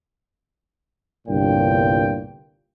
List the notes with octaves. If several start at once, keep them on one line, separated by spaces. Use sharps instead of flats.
G1 C2 G2 A#2 G5